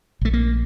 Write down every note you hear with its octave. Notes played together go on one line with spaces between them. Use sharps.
A#1 A3
A#3